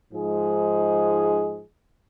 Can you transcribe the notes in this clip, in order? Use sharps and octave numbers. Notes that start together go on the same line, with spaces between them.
G#2 F3 G#3 D#4 G#4